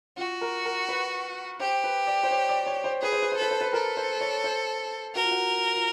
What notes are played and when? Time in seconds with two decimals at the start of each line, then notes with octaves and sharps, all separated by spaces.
0.17 F4 F#4
0.41 A#4
0.66 A#4
0.89 B4
1.60 G4 C5
1.84 B4
2.07 D5
2.23 C5
2.31 C#5
2.49 D5
2.66 C#5
2.84 C5
3.02 G#4 B4
3.12 C5
3.22 B4
3.32 C5
3.37 A4 B4
3.51 C5
3.61 B4
3.73 A4 A#4
3.97 C5
4.21 C#5
4.44 C5
5.15 F#4 A#4
5.24 F4
5.31 F#4
5.75 F4